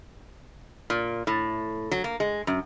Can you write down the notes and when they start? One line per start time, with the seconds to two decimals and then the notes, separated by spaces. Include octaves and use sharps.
0.90 A#2
1.27 A2
1.91 F#3
2.04 A#3
2.20 G#3
2.47 F#2